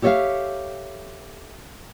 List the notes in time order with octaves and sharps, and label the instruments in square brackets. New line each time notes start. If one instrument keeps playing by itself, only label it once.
[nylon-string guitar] G4 A4 C#5 D5 E5 F5